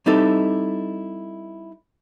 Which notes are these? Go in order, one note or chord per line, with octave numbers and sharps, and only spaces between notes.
G3 C4 D#4 E4 A4